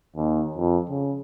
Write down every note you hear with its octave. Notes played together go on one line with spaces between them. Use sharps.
D#2
F2
C#3